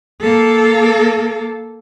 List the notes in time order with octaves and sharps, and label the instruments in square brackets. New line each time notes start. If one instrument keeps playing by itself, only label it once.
[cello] A#3 A4